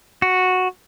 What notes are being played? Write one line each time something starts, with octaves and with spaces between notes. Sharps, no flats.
F#4